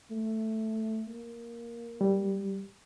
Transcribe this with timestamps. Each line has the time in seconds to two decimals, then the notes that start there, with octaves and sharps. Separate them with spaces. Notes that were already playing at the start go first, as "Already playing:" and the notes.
0.11 A3
1.08 A#3
2.01 G3